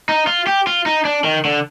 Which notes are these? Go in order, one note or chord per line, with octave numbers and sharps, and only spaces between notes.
D#4
F4
G4
F4
D#4
D4
D#3
D3